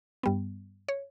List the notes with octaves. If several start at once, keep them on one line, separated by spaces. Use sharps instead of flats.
G2 G3 B3
C#5